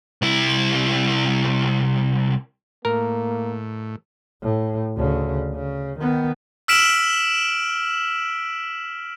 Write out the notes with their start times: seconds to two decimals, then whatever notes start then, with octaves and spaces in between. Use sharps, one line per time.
0.22 C2 E4
2.85 A2 A#3 A#4
4.42 A2
4.98 D2 C#3
5.54 C#3
5.99 D#3 B3
6.68 E6 F6 B6 D7 E7 F#7